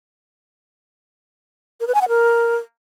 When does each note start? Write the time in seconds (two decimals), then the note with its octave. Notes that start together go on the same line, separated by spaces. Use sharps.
1.80 A#4
1.87 B4
1.94 G#5
2.01 F#5
2.08 A#4